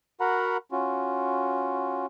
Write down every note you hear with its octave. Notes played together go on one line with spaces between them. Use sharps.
F#4 A#4 F#5 A#5 B5
C#4 F4 F#4